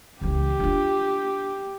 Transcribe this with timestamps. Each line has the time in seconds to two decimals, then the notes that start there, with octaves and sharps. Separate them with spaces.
0.21 C#2 E3 G4
0.59 D4 F4